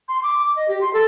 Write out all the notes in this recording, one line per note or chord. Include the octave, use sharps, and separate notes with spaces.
C6
D6
D6
D#5
G4
C6
A4